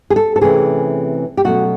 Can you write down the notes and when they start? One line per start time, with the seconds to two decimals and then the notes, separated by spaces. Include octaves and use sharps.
0.10 G#4
0.16 A4
0.36 A4
0.41 C3 E3 A3 C#4 G#4
1.37 G4
1.44 B2 F#3 A3 C#4 F#4